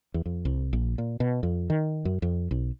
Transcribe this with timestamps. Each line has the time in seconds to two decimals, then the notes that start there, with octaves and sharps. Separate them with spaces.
0.14 E2
0.26 F2
0.45 C2
0.73 A#1
0.98 A#2
1.20 B2
1.43 F2
1.70 D#3
2.05 F#2
2.22 F2
2.51 B1